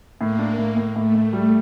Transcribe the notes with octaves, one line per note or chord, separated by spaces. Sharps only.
A2 A#3
D4
A2
A2
A2 A3
A2
G3